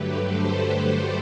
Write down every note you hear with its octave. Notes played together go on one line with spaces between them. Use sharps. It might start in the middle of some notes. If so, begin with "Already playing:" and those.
Already playing: G2 D3 F#3 A3 G4 B4
A4 C5
A4 C5